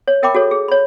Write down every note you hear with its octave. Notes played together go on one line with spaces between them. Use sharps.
C#5
A#4 E5 G5 A#5 B5 D6
F#4 G#4 A4 C#5
G#4
C#5 B5